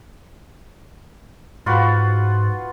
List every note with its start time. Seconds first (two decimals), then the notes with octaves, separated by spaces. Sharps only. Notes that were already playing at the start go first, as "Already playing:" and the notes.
1.66 G#2 F4 F#4 B4